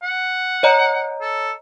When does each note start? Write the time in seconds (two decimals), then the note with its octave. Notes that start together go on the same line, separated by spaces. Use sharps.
0.03 F#5
0.63 C#5 D#5 A#5
1.21 A4